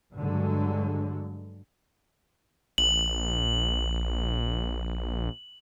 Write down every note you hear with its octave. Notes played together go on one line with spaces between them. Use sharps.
G2 D3 F#3 G#3
A#1 F#7